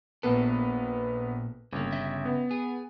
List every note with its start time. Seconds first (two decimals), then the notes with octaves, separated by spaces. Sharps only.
0.23 A#1 A#2 A#3 B3 A4 B4
1.73 G1 C#3 A#3
1.92 C#3 D#5 E5
2.25 B3
2.51 G#4